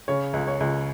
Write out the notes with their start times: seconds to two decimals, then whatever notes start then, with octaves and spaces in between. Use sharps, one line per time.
0.08 C#3 C#5
0.33 C#2
0.48 C#5
0.60 C#2